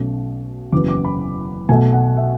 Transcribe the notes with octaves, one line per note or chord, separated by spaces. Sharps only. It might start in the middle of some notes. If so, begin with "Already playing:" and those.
Already playing: B1 B2 A3 C#4
F#1 E2 C#3 F#3 B3 D6
D6
B5
B1 B2 F#3 A3 G#5
F#5
E5